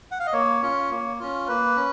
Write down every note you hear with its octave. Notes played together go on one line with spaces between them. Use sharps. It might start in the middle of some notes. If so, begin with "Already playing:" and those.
F#5
F5
D#5
A#3 C#5
C#4 F4
A#3
C#4 F4
A#3 B4
C#4